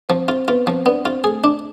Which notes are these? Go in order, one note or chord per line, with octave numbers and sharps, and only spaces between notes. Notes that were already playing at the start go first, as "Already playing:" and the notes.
F3 C4 C5
C4 F4 C5
B3 F4 B4
F3 C4 C5
B3 D4 D5
C4 F4 C5
A3 G#4 A4
D4